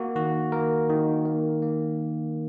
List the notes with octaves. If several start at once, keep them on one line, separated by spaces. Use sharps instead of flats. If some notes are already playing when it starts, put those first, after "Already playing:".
Already playing: A#3 F#4
D#3 F#4
A#3 A#4
D#3
A#3
A#3